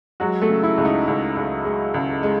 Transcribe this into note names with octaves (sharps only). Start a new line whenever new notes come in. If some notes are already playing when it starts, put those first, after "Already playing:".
F#3 G#3 F#4
A3 A4
C#3
E4
C#2
D#4
C#2
C#2
G#3
C#2
G#3